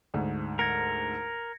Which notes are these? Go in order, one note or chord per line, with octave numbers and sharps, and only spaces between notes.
D2 G#2
A#4 G#6 A#6 C#7